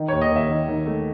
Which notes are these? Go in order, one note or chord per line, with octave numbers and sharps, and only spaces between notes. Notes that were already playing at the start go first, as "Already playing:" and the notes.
Already playing: D#3
C#5
D#2
D#5
D#2 E5
D#3
D#3
A3